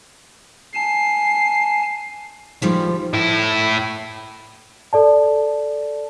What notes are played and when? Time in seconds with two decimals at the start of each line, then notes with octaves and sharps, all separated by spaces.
0.75 G#5 A5 C7
2.62 D#3 F3 G3 G#3
3.13 A2 E4
4.93 A4 D5 A5